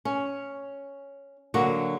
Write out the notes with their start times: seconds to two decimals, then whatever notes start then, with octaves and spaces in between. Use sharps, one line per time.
0.05 C#4
1.54 D3 F#3 A#3 F#4